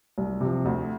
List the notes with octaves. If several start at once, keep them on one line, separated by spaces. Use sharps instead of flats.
C2
C3 F3
D2